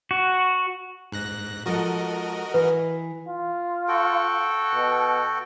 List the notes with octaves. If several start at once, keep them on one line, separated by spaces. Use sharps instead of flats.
F#4
G#2 F#6 A#6
F3 G#3 F#4 A4 A#4 D#5
E3 B4
F4
F#4 A4 G5
B2